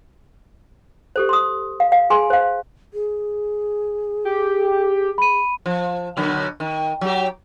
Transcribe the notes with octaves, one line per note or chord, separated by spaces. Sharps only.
G4 A4 C5
C6 D#6
F5
F5
G#4 G#5 C6
C5 F5
G#4
G4
B5 D#7
F3
B2 D3 F#3
D#3
F#3 G4